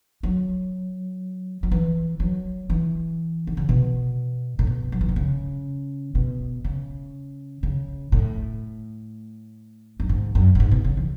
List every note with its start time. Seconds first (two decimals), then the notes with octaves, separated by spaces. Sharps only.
0.23 F#3
1.63 F#3
1.71 E3
2.20 F#3
2.70 E3
3.47 D3
3.57 C#3
3.69 B2
4.59 A2
4.67 B2
4.92 F#3
5.01 E3
5.09 D3
5.16 C#3
6.15 B2
6.64 C#3
7.63 C#3
8.12 A2
10.00 F#2
10.09 G#2
10.35 F#2
10.55 A2
10.60 G#2
10.71 B2
10.84 C#3
10.97 E3